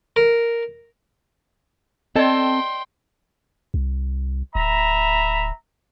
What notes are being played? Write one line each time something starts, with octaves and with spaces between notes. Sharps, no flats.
A#4
C4 A4 D5 D#5 G5 A5 C6
C2
D1 E5 A#5 B5